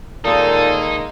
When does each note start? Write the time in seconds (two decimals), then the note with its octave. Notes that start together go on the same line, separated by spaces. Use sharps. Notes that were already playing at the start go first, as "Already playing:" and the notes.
0.25 A#2 D#3 G#3 A#3 D#4 A4